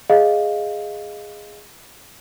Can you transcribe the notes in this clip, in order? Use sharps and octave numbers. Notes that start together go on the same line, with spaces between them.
G#4 D#5 F5